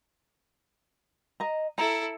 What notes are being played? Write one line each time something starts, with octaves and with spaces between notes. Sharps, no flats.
D#5 A#5
E4 A4 A#5